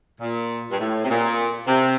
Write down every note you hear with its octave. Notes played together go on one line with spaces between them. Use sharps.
A#2
G2
A2
C3
A#2
C3